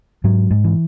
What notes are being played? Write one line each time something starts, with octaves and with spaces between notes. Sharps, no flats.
G#2 F#3
G#2
E3